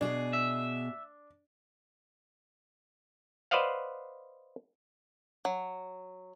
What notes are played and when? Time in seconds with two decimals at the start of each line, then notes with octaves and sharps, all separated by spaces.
0.01 B2 D4 G#4
0.33 E5
3.51 B4 C5 D5 D#5 F5 F#5
5.45 F#3